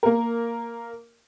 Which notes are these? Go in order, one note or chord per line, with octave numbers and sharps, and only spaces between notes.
A#3 A#4